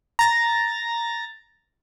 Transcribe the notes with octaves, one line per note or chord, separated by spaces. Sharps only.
A#5 A6 A#6